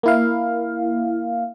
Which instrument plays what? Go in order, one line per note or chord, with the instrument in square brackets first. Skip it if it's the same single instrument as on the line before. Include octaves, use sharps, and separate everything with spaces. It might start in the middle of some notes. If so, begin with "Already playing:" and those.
[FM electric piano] A#3 E4 F5